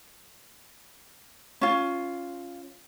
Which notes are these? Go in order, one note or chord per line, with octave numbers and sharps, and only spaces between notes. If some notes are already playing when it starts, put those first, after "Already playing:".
C#4 F4